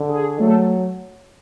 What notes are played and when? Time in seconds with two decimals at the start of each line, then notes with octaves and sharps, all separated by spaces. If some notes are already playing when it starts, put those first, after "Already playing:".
Already playing: D3
0.09 G#4
0.39 F#3 A3 A4